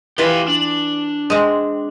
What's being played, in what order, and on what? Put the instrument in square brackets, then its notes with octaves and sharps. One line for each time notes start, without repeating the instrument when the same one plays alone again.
[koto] E3 F4 B4 [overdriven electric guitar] G4 F5
[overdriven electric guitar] D4
[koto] G#3 C4